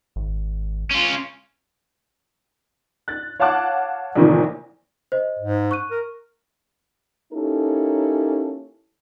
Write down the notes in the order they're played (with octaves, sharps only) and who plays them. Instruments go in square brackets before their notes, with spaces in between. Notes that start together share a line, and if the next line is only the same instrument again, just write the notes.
[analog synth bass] G#1
[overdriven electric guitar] C#4 F4
[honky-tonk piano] F#6 A6
C#5 F5 F#5 A5 D6 F#6
A#1 A2 C3 D#3 E3
[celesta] C5 D#5
[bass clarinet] G#2
[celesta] C#6 F#6 D#7
[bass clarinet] A#4
[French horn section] A#3 C#4 D#4 E4 G4 A4